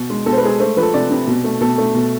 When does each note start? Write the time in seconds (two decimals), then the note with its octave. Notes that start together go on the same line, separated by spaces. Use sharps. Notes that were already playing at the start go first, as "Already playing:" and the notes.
Already playing: B2
0.10 G#3
0.26 B2 A4
0.33 C5
0.37 B4
0.43 G#3 G#4
0.49 A4
0.60 A3 C5
0.77 F3 B4
0.83 A4
0.94 C3 D5
1.11 C3
1.28 B2
1.44 A3
1.61 B2 A4
1.78 A3
1.95 B2